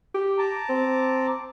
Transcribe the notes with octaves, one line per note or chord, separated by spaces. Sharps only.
G4
A5 A#5 D6
C4